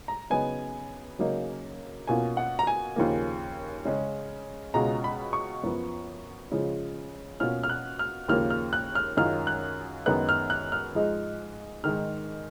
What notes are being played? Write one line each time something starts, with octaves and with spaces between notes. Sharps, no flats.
A#5
C#3 F#3 B3 D#4 G#5
C#3 F#3 A#3 D#4
B2 A#3 C#4 F4 G#5
F#5
A#5
G#5
D#2 C#3 F3 A#3
C#3 G#3 C#4
C#2 B2 G#3 C#4 F4 A#5
B5
C#6
F#2 F3 B3
C#3 F3 G#3
B2 A#3 C#4 F4 F6
F6
F#6
F6
D#2 C#3 F3 A#3 F6
F6
F#6
F6
F#2 D#3 G#3 C#4 F4 F6
F#6
F#2 D#3 G#3 B3 F#6
F6
F#6
F6
G#2 F3 G#3 D#4
G#2 D#3 G#3 F6